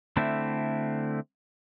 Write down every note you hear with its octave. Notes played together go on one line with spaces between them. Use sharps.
D3 A3 C4 E4